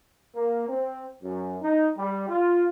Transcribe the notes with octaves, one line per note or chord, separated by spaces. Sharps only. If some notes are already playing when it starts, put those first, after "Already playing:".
A#3
C4
F#2
D#4
G3
F4